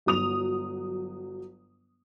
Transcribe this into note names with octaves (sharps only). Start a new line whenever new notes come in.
G1 F#3 D#6 F7